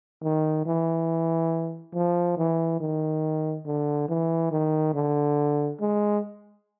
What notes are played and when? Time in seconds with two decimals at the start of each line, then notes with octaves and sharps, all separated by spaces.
0.23 D#3
0.66 E3
1.94 F3
2.37 E3
2.80 D#3
3.66 D3
4.09 E3
4.51 D#3
4.94 D3
5.80 G#3